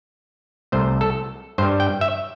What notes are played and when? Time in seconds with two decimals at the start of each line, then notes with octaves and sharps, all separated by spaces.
0.72 C2 C3 A3 C5
1.01 A4
1.58 G2 C5
1.63 G3
1.80 G5
2.01 E5